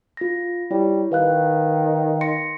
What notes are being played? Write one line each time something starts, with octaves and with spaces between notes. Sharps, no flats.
F4 A#6
G3 E4 C#5
D#3 B4 F5 F#6
C6 A#6 C#7